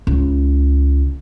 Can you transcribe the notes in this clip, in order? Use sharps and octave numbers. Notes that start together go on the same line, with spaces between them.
C#2